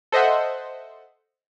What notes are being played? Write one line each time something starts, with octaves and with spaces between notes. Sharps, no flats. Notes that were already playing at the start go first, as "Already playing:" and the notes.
A4 C5 D#5 E5 F#5